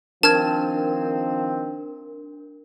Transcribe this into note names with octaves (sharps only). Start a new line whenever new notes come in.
D#3 F3 C4 D4 A#4 A5 F6 G#6